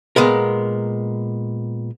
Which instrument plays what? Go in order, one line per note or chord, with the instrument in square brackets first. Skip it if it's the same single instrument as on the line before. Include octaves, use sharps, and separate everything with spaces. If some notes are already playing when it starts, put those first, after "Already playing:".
[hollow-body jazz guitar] A#2 G#3 B3 A#4